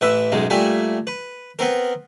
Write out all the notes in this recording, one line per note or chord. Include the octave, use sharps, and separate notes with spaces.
A1 E3 B4 E5
B1 F#2 G#3
A#2 G3 A3 G#5
B4
B3 C4 A#4